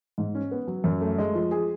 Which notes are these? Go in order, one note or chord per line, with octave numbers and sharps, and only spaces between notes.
G#2
C#4
B3
F#3
F#2
A3
G#3
F3
G#4